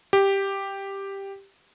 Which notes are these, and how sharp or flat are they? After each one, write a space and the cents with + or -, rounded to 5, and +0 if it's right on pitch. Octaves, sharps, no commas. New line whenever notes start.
G4 +5